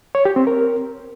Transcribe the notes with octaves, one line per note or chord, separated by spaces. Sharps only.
C#5
G4
C4
A#4